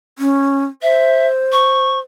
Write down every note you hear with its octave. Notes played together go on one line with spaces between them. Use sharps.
C#4
C5 E5
C#6